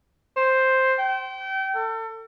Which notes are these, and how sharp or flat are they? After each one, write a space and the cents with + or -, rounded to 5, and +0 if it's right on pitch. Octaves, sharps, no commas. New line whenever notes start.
C5 +5
G5 -30
A4 +35